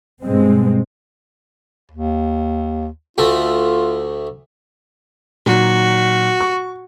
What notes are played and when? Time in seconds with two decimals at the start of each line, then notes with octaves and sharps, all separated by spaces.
0.23 G2 B2 G#3 C4
1.92 D#2
3.18 D2 A3 F4
5.46 A#2 D#3 F#3 F#4
6.40 C#6